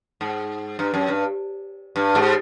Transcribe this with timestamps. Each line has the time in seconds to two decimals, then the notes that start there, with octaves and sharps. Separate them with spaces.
0.21 G#2
0.79 G2
0.94 F#2
1.08 G2
1.96 G2
2.15 G#2